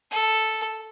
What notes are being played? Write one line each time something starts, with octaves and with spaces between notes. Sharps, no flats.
A4